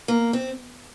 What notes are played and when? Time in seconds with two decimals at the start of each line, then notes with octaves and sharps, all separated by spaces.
0.08 A#3
0.33 C4